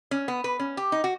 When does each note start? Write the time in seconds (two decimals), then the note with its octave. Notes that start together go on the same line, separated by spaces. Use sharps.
0.11 C#4
0.28 B3
0.44 B4
0.59 C#4
0.77 G4
0.92 D#4
1.04 F#4